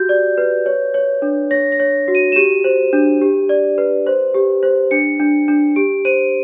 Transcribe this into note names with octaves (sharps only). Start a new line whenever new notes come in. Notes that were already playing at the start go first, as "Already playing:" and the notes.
Already playing: F#4 G4 G6
D5
B4
C#5
C#5
D4
C#5 A#6
A#6
C#5
F#4
D#7
E7
G4 D#7
C5
D4
G4
D5
B4
C5
G4
C5
D4 C#7
D4
D4
G4 D7
C5 D#7